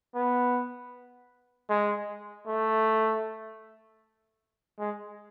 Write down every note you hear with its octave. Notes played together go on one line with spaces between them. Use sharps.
B3
G#3
A3
G#3